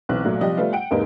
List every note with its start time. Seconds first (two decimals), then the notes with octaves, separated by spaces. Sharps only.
0.09 B1 E3 C4 F#6
0.24 A#2 F#3 A3
0.41 C3 F3 G3 G4 D#5
0.57 G3 A3 B3 F4
0.73 F#5 G5 D7
0.91 E2 G#2 C3 A#3 B3 D#4